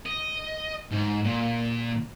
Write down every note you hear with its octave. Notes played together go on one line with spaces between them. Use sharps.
D#5
G#2
A#2